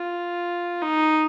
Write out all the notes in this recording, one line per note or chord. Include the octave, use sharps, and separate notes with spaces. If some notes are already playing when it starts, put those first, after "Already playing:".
Already playing: F4
D#4